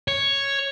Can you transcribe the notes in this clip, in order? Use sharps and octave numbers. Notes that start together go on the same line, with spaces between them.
C#5